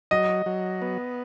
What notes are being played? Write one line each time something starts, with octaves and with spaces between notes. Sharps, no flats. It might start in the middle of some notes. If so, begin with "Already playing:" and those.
F#3 D#5
F#3
B3